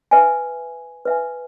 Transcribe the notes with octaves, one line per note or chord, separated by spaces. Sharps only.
B4 E5 G#5
B4 E5 G#5